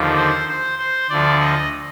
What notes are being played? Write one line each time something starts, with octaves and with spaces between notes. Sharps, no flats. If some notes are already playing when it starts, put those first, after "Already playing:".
Already playing: D#2 D3 F3
C5
C5
C5
D2 D3 F3 D5
D#5